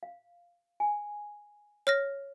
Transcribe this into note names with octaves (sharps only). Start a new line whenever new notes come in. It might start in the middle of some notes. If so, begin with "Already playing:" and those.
F5
G#5
C#5 F6 A#6